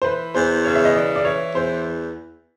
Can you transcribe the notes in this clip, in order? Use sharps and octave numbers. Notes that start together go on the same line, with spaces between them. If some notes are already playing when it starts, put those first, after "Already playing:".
C5
E3 B4
E2 C5
C#3 C#5
E5
D#5
E3 D5
D5
E3 C#5
E2 C5